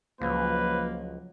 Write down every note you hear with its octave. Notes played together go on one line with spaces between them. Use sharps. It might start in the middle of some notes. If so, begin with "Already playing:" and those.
C#2 F3 F#3 A#3 B4